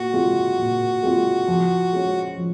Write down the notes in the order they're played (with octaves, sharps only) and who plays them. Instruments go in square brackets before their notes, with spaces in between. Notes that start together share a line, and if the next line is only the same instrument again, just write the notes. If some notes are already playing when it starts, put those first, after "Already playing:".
Already playing: [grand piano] A#2 [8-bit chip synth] F#4
[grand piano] G#3 C4 F4
A#2
G#3 C4 F4
F3
G#3 C#4
F3